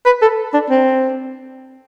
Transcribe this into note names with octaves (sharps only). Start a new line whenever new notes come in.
B4
A4
D4
C4